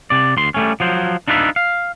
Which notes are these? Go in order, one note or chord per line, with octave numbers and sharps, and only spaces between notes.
C3 D5
D2 C6
G3 A3 C#4
F3 F#3 C5
D4 D#4 F4 B4 C#5 E5
F5